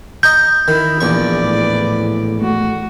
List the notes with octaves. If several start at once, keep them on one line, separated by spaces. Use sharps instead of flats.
D#5 A#5 C#6 G6
D#3 E4
A#1 E2 B4 D5 C#6
A2
A3 F#4